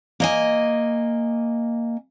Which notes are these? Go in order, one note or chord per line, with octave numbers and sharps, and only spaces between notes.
A#3 D#5 G#5